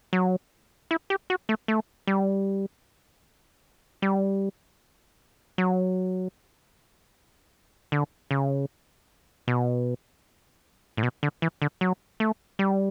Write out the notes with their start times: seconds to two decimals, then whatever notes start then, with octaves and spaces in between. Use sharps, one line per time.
0.13 F#3
0.91 E4
1.10 G4
1.30 F#4
1.49 A3
1.68 A3
2.07 G3
4.02 G3
5.58 F#3
7.92 D3
8.31 C#3
9.48 B2
10.97 A2
11.03 B2
11.23 D3
11.42 E3
11.62 D3
11.81 F#3
12.20 A3
12.59 G3